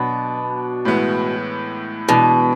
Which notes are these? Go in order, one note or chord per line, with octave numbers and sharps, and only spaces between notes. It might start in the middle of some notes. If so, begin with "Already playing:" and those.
Already playing: B2 F#3 B3 D4
A2 E3 G#3 B3 E4
B2 E3 G#3 D4